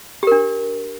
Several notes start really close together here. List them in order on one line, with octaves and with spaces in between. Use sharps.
G4 A#4 D4